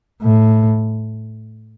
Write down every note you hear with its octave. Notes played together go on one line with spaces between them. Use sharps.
A2